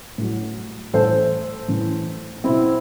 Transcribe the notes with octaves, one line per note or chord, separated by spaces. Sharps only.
A2 F#3
A2 E3 A4 C5
A2 E3
B2 F#3 C4 E4